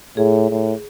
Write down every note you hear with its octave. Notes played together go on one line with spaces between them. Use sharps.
A2 G#4
A2